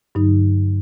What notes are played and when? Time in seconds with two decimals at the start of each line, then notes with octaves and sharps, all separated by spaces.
0.15 G2 D3 F#3 D#4